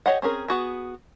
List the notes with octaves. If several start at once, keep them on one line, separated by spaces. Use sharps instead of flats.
G4 C#5 D#5 F#5
C4 C#4 G#4 A#4
B3 F#4 G#4